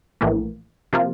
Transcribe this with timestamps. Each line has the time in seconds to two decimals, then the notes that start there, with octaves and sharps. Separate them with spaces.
0.21 A#1 A2 E3 A#3
0.93 C3 F3 A#3 F4